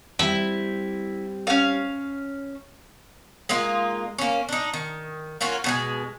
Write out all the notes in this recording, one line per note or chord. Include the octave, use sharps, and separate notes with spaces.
G3 C4 E4
C#4 F5
G#3 A#3 D#4 F4
A#3 C#4
D4 D#4
D#3
A#3 C#4 F4 F#4
B2 F#3 G#3